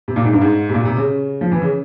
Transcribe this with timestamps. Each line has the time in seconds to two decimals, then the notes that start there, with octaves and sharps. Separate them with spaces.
0.08 C3
0.16 A#2
0.24 G#2
0.33 G2
0.41 G#2
0.69 C3
0.74 A#2
0.85 C3
0.97 C#3
1.41 F3
1.52 E3
1.62 C#3